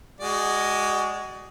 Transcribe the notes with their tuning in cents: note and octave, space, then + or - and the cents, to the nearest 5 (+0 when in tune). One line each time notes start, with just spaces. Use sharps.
G#3 +0 F#4 +25 D5 +20